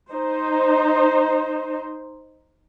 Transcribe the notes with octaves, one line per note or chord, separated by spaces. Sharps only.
D#4 C5